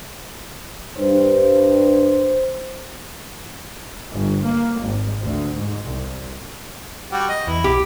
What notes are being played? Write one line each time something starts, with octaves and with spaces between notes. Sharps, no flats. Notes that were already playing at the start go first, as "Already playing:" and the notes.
G2 C5
G1
A#3
G#1
D2
G#2
C2
G3 F#4 G4
D#5
E2 E4
B1 G4